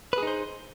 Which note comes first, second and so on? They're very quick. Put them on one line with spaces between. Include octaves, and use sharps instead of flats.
B4 G#4 D#4 C5